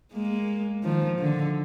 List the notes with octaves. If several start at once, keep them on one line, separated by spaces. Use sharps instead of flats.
G#3 A#3
D#3 F3
D3